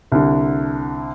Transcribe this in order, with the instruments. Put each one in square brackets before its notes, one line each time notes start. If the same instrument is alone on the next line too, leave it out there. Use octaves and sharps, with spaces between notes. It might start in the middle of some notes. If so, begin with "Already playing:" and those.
[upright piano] C2 D3